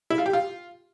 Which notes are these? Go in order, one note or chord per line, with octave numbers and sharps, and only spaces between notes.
E4
F4
G4
F4